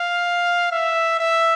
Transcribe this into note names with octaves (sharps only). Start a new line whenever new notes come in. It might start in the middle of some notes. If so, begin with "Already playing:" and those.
Already playing: F5
E5
E5